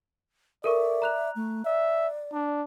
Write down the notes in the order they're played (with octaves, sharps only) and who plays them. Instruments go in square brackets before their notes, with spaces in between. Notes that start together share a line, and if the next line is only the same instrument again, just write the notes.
[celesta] A4 A#4 C#6 [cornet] D5 [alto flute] E5
[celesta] A#5 F#6 F7
[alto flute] A3
[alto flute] D5 [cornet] E5
[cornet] D4